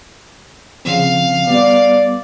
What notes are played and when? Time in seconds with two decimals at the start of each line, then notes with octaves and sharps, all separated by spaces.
0.85 C#3 F3 C4 F5
1.47 G3 B3 D5